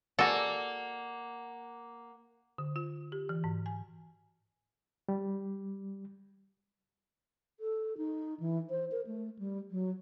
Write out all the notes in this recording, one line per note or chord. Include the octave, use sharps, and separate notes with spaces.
A#3 F#4 G#4 A4 D5 F#5
D3
F4
G4
E3
G#2
G#5
G3
A4
D#4
E3
C5
A#4
A3
G3
F#3